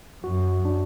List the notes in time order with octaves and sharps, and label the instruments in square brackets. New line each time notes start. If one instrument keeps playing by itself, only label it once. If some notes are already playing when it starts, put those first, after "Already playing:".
[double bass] F#2 [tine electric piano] F#4
[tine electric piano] D4